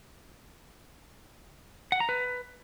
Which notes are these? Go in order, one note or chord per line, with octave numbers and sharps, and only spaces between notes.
F#5
A#5
B4